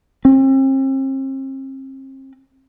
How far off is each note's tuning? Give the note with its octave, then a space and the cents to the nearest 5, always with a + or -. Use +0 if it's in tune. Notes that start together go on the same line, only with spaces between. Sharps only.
C4 +40